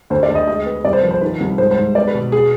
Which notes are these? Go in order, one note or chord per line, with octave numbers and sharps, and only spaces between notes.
D2 C5
D5
D2
D#5
G#3 D#5
B3
C2 D5
C5
F3 B4
C5
D#3 B4
C2
G#2 C5
C5
G#2
B3 D5
B4
B2
G#4